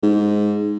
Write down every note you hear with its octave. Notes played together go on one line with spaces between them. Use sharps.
G#2